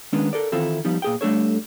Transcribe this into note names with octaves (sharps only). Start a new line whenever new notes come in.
D#3 G#3 B3 C#4 D4
A4 A#4 D5
D#3 E3 C4 E4 F4 A4
F3 G3 B3 D#4
A#2 G#4 G5
G3 A3 D4 A4 C#5